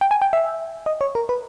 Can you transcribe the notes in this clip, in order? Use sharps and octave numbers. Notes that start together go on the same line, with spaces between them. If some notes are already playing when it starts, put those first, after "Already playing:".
G5
G#5
G5
E5
D#5
C#5
A#4
B4